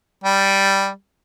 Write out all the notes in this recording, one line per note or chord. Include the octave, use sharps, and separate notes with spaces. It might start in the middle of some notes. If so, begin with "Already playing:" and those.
G3